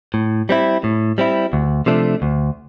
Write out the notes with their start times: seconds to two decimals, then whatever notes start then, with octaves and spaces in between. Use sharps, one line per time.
0.14 A2
0.49 G3 C4 E4
0.84 A2
1.18 G3 C4 E4
1.53 D2
1.86 C3 F3 A3 D4
2.22 D2